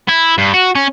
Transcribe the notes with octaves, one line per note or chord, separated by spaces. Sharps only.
E4
G2
F#4
C#4